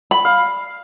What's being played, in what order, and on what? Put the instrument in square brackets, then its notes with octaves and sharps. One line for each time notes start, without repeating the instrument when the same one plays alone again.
[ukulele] B5
[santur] F5